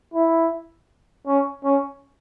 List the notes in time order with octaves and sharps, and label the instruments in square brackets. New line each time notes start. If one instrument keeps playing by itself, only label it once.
[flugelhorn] E4
C#4
C#4